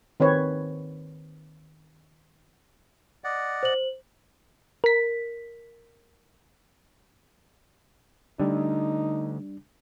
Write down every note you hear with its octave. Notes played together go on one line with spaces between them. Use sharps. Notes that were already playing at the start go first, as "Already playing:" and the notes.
D#3 C4 B4 C#5
D5 D#5 F#5
C5 F#7
A#4 B6
D3 G3 A3 D4 D#4